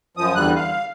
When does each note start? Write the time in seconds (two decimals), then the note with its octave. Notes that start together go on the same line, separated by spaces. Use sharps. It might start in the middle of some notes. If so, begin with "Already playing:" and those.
0.17 F#2 F3 D#6
0.35 E2 D3 G3 F#6
0.56 F5